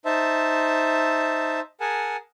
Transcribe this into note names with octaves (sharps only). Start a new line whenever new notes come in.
D#4 C5 E5 A5
G#4 A#4 F#5 G#5 A5